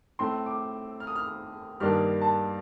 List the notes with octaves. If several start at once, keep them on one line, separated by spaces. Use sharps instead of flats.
A2 A3 C4 C6
D6
F6
D#6
F6
G2 D#3 A#3 D4 F6
A5